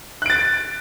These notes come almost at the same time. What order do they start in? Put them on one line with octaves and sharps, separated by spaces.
F#6 D7 A6